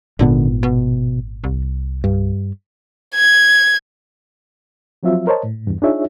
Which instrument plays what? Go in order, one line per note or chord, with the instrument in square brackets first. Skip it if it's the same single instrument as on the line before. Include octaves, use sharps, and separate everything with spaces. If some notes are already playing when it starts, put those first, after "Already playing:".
[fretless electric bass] G#1 A#2 B3 [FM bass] D3
[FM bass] B2
C2
[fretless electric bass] G2
[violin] G#6
[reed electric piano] F3 F#3 C4 F4 E5
A#4 C5 C#5 D#5 A5
A2
E2 G2
D4 D#4 F4 G#4 C#5 E5